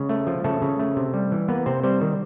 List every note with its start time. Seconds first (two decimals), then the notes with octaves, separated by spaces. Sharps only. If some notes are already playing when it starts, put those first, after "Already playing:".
Already playing: C#3 G#3
0.09 A3
0.27 F3
0.44 C#3 A3 A4
0.62 C#3
0.79 A3
0.96 C3
1.14 G3
1.32 E3
1.48 A#3 B3 B4
1.66 C3 C4 C5
1.83 G3 C4 C5
2.01 D#3